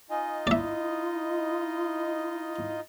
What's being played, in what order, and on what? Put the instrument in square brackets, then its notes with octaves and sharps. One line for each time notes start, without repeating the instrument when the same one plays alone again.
[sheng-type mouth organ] D#4 F4 D#5 [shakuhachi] G#5
[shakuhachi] E4 [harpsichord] D5 E5